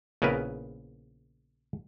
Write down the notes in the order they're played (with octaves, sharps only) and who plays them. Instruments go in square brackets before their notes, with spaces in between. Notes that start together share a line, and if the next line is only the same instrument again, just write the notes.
[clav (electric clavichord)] A#1 C#3 B3 E4 A#4 B4